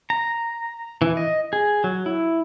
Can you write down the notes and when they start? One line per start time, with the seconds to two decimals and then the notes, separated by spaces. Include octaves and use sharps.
0.10 A#5
1.02 E3
1.17 D#5
1.53 G#4
1.84 F#3
2.06 E4